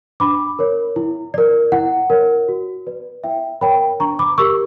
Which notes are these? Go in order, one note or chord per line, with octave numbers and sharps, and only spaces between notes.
D4 B5 D6
A#4 C#5
E4
A#4 D5
E4 F#5
A#4 C#5
F#4
B4 D5
E4 E5 G5
A#4 C#5 G5 B5
D4 A#5 C#6
B5 D6
G4 A#4 C#6 E6